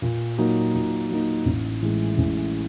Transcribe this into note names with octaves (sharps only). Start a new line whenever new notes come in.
A#2
F#3 A#3 D#4
A#2
F#3 A#3 D#4
A1
A2 E3 G#3
A1